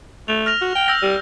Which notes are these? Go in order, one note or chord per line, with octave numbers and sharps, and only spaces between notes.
A3 F7
F6 A#6 F7
F#4
G5
E6 G6 A#6
G3